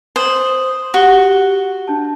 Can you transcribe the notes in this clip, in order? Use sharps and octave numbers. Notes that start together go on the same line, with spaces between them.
C5 D#6 F#7
F#4 G4 G7
D4 A5